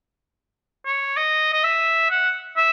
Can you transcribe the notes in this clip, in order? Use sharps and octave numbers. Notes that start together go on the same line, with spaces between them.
C#5
D#5
D#5
E5
F#5
E5